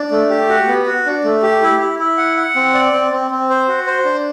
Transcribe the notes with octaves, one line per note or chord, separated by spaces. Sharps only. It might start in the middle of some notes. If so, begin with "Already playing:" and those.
Already playing: D4
A3
G4
F#4
B3
F#4
D4
A3
G4
E4
E4
E4
F#5
F#5
C4
D5
C4
C4
C4
C5
F#4
C5
D4